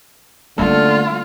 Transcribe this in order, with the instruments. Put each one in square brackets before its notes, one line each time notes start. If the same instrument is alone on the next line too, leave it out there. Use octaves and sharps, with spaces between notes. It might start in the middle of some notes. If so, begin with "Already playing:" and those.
[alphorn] D3 [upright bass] G3 C#4 [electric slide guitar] A3 A#3 A4 [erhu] F4